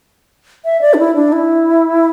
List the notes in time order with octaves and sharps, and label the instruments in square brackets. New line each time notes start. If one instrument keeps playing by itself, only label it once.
[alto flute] E5
D5
D4
E4
D4
E4